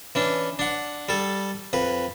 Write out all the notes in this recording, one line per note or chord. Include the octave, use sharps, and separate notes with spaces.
E3 C#4 D4
D4 F#5
G3 A4
F2 B4